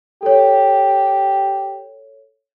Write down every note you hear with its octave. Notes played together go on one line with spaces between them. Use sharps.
G4 A4 C#5